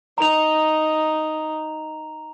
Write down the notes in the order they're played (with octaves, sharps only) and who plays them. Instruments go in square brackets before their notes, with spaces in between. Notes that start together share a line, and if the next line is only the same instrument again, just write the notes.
[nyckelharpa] D#4 [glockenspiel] A#5 F7